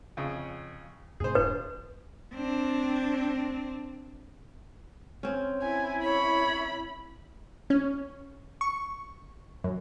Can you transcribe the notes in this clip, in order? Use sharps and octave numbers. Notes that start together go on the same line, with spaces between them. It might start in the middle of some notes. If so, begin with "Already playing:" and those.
F2 C#3
F#2 A2 C3 G#4 C5
D1 G2 D4 B4
C4 D4
C4 C#4
E4 G#5
C#5 B5
C#4
C#6
F#2